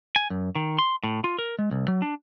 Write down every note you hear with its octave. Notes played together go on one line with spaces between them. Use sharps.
G#5
F#2
D#3
C6
A2
F4
A#4
G#3
C2
F#3
D4